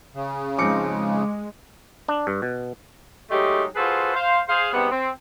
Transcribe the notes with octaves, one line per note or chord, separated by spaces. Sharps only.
C#3
F3 G#3 C4 D#4 D6 C#7
D4
G2
B2
F#3 G#3 A3 D#4 G4
F4 F#4 G#4 A4 B4 C5
C5 F5
G#4 C5 F5
G#2 C3 G3 B3
C4